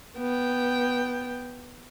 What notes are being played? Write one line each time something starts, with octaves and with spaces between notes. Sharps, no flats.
B3 G5